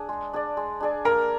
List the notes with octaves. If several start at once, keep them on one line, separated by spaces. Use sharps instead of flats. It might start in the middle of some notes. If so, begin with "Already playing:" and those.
Already playing: D4 G#4 D5
G#3
D4 G#4 D5
G#3
D4 G#4 D5
A#3 A#4